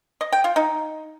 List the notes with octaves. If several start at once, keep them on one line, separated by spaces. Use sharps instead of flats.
D#5
G5
F4
D#4